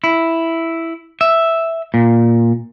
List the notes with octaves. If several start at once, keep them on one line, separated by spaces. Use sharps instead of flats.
E4
E5
A#2